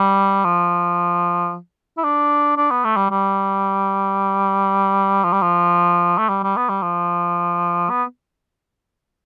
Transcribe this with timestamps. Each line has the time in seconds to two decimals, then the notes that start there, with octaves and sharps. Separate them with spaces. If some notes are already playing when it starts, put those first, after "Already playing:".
Already playing: G3
0.44 F3
1.98 E4
2.04 D4
2.57 D4
2.71 B3
2.84 A3
2.97 G3
3.11 G3
5.24 F3
5.32 G3
5.42 F3
6.18 A3
6.29 G3
6.43 G3
6.57 B3
6.69 G3
6.82 F3
7.90 B3